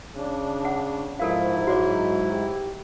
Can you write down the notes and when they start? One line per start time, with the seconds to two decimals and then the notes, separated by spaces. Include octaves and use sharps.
0.16 C#3 D4
0.65 F#5
1.19 G#2 F3 E4 A4 A#4 F5
1.67 F#3 F#4 C#5 D6
2.32 G4